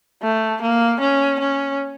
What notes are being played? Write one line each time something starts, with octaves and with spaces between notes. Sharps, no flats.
A3
A#3
C#4
C#4